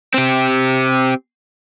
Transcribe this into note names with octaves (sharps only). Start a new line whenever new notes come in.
C4 G4